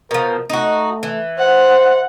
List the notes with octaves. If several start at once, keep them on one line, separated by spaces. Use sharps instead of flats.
B2 F3 A#4
A3 D#4 F#4
E3
C5 F#5